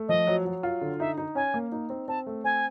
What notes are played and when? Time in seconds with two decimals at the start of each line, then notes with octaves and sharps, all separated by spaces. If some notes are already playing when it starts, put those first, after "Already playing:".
Already playing: A3
0.08 F3 D#5
0.27 F#3
0.45 F#3
0.63 F4
0.81 D3
1.00 D#4 E5
1.18 D#4
1.35 C#4 G#5
1.54 A#3
1.72 D#4
1.90 C4
2.08 C4 A5
2.27 A3
2.44 C4 G#5